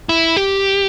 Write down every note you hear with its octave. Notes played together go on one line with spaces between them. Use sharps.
E4
G4